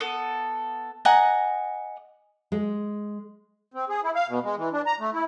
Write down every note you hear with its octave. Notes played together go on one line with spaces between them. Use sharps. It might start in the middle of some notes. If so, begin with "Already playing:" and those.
B3 A4
D#5 F#5 G#5 A#5
G#3
C4
G#4
E4
F5
B2
G#3
E3
D4
A#5
A3
E4